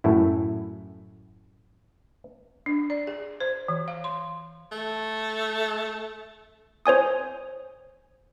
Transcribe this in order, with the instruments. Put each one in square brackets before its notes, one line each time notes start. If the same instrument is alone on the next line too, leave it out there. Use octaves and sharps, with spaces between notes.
[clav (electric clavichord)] F#2 A2 E4
[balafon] D4
D5
G#4
C5
E3
F5
C6
[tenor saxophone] A3
[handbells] C5 C#5 G#5 D#6